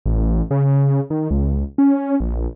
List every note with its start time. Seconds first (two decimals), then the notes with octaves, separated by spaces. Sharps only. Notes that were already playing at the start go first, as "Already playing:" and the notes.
0.06 A1
0.51 C#3
1.10 D#3
1.31 C#2
1.78 C#4
2.20 A#1